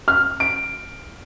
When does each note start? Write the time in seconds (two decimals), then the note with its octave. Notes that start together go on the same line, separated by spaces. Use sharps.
0.08 F6
0.40 D7